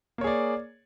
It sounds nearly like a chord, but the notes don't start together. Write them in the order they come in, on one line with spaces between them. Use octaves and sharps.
A#3 C#5 G#4 D5